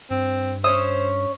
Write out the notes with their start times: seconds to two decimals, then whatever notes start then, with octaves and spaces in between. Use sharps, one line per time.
0.11 G2 C4
0.64 C#4 C5 C#5 E5 D#6